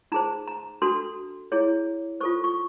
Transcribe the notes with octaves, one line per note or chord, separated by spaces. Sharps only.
D#4 G#4 C5 A#5
A#5
D4 F#4 A4 C6
E4 G#4 C#5
F4 A4 C5 C#6
C#6